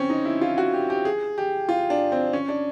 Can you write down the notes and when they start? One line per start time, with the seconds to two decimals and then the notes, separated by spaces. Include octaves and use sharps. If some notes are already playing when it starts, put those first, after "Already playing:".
Already playing: C4 C#4
0.10 D#4
0.25 E4
0.41 F4
0.58 F#4
0.73 G4
0.90 G4
1.05 G#4
1.38 G4
1.69 F4
1.90 D4
2.12 C4
2.33 C#4
2.48 D4